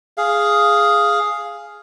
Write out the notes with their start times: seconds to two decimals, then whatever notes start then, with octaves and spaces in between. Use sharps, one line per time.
0.18 G#4 F5